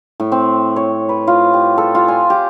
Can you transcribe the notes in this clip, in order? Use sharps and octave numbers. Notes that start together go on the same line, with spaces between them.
A2
C4
C#5
B4
F4
G4
A4
F4
G#5
G4